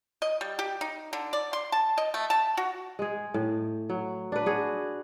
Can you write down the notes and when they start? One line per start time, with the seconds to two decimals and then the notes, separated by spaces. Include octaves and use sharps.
0.22 D#5
0.41 G3
0.59 G4
0.81 D#4
1.13 D3
1.33 D5
1.53 C6
1.72 A5
1.98 D#5
2.14 A3
2.30 A5
2.57 F#4
2.99 G#3 G#4
3.34 A2
3.90 F#3
4.32 D4 B4
4.46 F#4 G#4